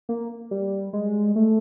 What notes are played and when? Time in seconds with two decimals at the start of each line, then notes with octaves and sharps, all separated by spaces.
0.09 A#3
0.51 G3
0.93 G#3
1.36 A3